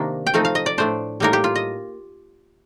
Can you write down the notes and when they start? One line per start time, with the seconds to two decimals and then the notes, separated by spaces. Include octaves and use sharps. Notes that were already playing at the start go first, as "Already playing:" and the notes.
Already playing: C3 D#3 A#3 D4
0.27 G5
0.34 F3 A3 C4 D#4 F5
0.45 F5
0.55 D#5
0.66 D5
0.78 A2 A3 D4 C5
1.20 A2 G3 A#3 D#4 A#4
1.33 G4
1.44 F4
1.55 D#5